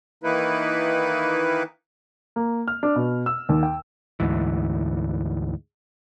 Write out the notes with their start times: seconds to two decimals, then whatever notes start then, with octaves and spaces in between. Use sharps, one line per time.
0.24 D#3 E3 A#3 D#4 E4 B4
2.36 A#3
2.68 F6
2.83 D4
2.96 B2
3.26 E6
3.49 D#2
3.63 G5
4.20 D2 G#2 E3